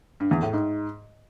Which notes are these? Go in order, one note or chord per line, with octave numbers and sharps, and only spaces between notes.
G2
E2
A2
G#2